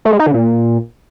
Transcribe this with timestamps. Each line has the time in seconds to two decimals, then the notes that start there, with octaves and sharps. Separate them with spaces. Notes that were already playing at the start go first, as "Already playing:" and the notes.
0.05 A3
0.12 G#3
0.19 D#4
0.27 D3
0.34 A#2